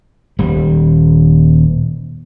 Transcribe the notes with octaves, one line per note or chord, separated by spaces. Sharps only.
D#1 G3